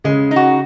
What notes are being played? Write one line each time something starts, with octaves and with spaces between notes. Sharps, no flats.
C#3 G#3
D#4
F#4